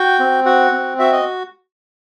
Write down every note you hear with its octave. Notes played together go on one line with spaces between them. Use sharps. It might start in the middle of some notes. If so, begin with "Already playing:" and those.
Already playing: F#4 G5
C4
F#4 F#5
C4
F#4 E5
D#5